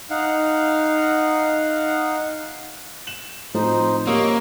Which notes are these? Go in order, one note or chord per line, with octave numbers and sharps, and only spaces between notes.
D#4 F5 F#5
E7 F#7
A2 F3 C4 D#4 C5
A#3 C#4 G4 D#5 C#6 E6